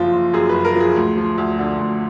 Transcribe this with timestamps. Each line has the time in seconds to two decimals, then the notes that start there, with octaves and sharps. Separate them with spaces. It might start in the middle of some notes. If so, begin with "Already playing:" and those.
Already playing: F#1 F3 F4
0.13 F#1
0.33 F#2 G#4
0.49 B4
0.54 F#1
0.65 A#4
0.75 F3
0.80 G#4
0.96 D2
1.17 F3
1.38 D2
1.59 D3
1.79 D2